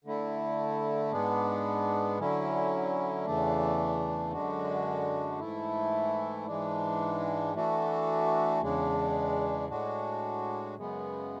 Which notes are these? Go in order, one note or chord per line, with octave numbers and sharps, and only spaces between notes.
D3 A3 E4
G#2 G#3 B3 D4
D3 F#3 C#4 E4
E2 C#3 E3 A3 D4
F#2 D3 G#3 D4 F#4
G#2 E3 A3 E4
G#2 E3 G#3 D4
E3 A3 D4 F#4
E2 C#3 G#3 D4
A2 G#3 D4 F#4
F#2 C#3 G#3 B3